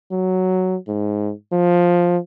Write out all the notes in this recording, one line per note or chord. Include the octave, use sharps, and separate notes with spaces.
F#3
G#2
F3